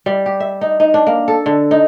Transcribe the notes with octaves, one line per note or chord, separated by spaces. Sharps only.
G3
G4
E5
D#4
D#4
D4
A#3
A4
D3
D#4